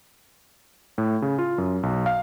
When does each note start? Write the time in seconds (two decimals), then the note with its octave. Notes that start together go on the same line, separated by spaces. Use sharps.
0.98 A2
1.22 C#3
1.39 F4
1.58 F#2
1.83 B1
2.06 F5